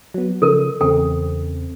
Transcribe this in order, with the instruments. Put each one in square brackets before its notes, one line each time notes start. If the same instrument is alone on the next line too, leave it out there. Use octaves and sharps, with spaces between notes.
[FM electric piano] F#3 B3
[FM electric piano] C#3 F3 [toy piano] A4 A#4
[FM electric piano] E2 C#3 C4 [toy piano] A4 G5